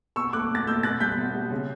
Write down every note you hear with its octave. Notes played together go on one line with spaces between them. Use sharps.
B2 C#6 E6
A3 D6 F#6
B2
A6
A3 E6 G6
B2 F#6 A6
G3 G6 B6
B2
G3
C#3